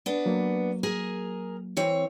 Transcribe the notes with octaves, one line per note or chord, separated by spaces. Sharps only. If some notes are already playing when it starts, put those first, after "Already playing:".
B3 D4
F#3 A#3
G#4 A#4 G#5
E3 C4 C#5